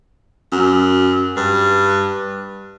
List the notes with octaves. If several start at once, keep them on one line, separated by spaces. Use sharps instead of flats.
F#2
G2